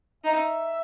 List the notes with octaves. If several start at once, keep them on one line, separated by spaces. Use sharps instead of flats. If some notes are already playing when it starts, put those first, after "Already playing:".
D#4 E5